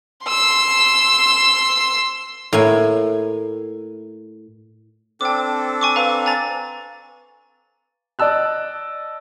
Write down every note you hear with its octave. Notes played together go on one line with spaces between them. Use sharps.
C6 E6
A2 A#3 G#5
C4 D4 A4 G5 D6
G#5 C#6 D6
B4 F5 A#5
G#5 A#5 A6
D5 D#5 A5 E6 F#6